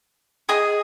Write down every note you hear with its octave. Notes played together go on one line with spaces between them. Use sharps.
G#4 D#5 G#5 D#6